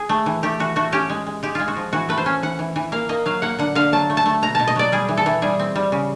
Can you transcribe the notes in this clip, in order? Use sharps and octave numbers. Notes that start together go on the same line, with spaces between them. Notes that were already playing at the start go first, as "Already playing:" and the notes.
Already playing: G#4
A3
E3
A3 G4
E3 F#4
A3 F#4
C#4 G4
G#3
G#3
G#3 G4
G#3 F4
F#4
F3
E3 F#4
A3 B4
C5
C#4
E3 F#5
E3
E3
A#3 F5
A#3 D#5
F#3 F5
A#3 F#5
D3 F#5
D3 F5
F#3 A5
A3
A5
A3
B2 A#5
B2 A5
D#5
F#3 D5
G3 G#4
E3
A4
E3
G3 G#4
C4
G3
C#3